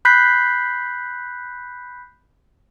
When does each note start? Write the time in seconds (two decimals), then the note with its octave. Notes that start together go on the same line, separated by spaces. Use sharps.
0.05 B5 F#6 G6 B6 C7